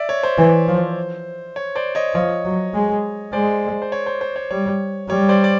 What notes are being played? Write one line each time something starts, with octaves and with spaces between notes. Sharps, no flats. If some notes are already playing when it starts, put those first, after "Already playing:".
Already playing: D5 E5
C#5
C5
E3
F3
C#5
C5 D5
C#5 D#5
F3 C#5 D#5
F#3
G#3
G#3 C5 D5
C5
C#5
C5
C5
C#5
G3 C#5
G3 C#5
C5 D5
D5